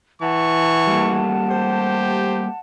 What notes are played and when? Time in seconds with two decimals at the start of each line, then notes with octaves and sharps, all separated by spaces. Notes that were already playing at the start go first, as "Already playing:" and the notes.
0.21 E3 F#5 A5 C#6
0.87 G3 A3 A#3
1.50 G4 C5